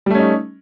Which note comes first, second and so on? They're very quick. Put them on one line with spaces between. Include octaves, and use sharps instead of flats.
G3 A3 C#4 D#4